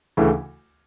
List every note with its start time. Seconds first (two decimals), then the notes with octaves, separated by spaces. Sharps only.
0.17 D2 C#3 E3 A3